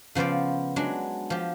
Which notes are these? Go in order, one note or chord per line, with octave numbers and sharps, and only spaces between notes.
C#3 F3 B3 C5 D5
F#3 G#3 D4
F3 G4